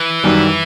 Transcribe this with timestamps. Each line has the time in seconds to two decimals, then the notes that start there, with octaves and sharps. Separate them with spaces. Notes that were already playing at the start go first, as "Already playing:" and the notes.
Already playing: E3
0.24 F#2 D#3 G3